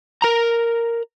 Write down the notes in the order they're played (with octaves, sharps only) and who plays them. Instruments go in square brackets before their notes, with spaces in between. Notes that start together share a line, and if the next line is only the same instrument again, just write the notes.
[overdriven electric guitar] A#4 A#5